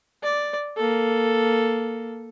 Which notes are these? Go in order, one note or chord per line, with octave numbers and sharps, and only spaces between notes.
D5
A#3 A4